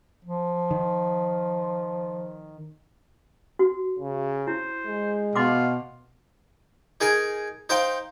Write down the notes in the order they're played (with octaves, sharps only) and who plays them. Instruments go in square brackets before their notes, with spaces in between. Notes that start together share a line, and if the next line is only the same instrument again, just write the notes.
[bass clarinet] F3
[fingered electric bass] D#3
[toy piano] F#4
[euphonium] C#3
[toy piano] E4 [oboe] C5
[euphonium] G#3
[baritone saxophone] B2 [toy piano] D#5 C6 D6 [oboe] F5
[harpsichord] D#4 G#4 A#4 G#5
D#4 C5 F5 G5